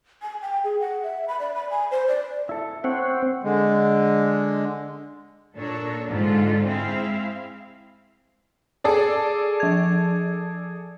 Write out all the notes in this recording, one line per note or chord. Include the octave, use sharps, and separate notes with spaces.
G#5
G5
G#4
F#5
E5
B5
D5
B5
G#5
C5
D5
E4 A4
C4 C#5 F#5 G5
D3 G#3
A#2 D4 A4 A#4 C#5
G#2 D3 F4 A4
G#3 C4 E4 G#4 F5
G#4 A4 D5
F3 G#6